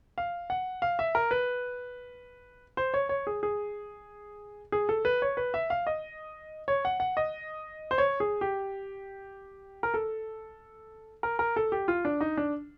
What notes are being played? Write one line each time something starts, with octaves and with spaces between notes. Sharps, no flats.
F5
F#5
F5
E5
A#4
B4
C5
C#5
C#5
G#4
G#4
G#4
A4
B4
C#5
B4
E5
F5
D#5
C#5
F#5
F#5
D#5
C5
C#5
G#4
G4
A#4
A4
A#4
A#4
A4
G4
F4
D4
D#4
D4